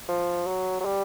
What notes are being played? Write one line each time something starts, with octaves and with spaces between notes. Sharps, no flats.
F3
F#3
F#3
G3